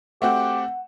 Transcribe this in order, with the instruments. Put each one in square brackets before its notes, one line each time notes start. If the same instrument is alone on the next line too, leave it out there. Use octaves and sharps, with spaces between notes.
[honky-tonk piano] A3 C4 F#4 [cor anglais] G4 [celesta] F#5